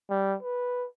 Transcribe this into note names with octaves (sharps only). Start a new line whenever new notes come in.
G3
B4